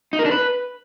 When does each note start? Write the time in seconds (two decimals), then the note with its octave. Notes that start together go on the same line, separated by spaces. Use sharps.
0.13 D#4
0.19 A#4
0.25 D4
0.31 B4